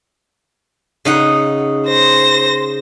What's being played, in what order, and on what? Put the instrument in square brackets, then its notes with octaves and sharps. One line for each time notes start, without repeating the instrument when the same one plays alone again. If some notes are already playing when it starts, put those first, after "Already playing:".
[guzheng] C#3 D#4 F#5
[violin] C5 A#6